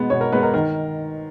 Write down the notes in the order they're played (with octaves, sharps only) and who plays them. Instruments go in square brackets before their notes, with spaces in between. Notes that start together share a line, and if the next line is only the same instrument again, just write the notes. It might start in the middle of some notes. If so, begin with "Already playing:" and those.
Already playing: [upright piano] B2 G#3 B3
B2 C#5
A#4
G#3 B3 B4
A#4
D#3 A#4